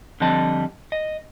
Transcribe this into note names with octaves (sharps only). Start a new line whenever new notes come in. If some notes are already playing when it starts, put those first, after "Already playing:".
D3 F3 G3 C4 D#5 A5
D#5